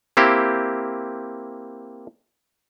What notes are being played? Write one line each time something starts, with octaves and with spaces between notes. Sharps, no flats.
A#3 C4 E4 G4